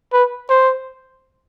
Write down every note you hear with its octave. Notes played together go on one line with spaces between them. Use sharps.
B4
C5